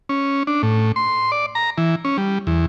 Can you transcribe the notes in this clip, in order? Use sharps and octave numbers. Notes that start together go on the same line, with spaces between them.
C#4
D4
A2
C6
D5
A#5
E3
C#4
G3
E2